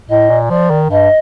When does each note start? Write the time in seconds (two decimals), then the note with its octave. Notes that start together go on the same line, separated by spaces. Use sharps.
0.09 A2 D#5
0.30 A#2
0.50 F3 D5
0.70 D#3
0.90 G2 D#5